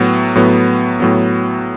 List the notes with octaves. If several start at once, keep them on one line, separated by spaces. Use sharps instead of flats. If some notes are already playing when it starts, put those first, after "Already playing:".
Already playing: A2 F#3 B3
A2 F#3 B3
A2 F#3 B3